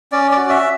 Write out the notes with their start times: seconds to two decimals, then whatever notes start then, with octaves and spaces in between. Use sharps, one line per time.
0.12 C#4 D5
0.31 D5
0.37 F#4
0.49 E5